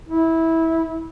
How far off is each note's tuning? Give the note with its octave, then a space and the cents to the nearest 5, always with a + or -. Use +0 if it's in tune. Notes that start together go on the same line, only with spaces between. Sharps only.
E4 -15